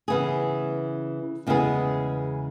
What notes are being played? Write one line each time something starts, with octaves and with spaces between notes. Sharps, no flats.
C#3 E3 B3 G#4
E2 C#3 G#3 B3 G#4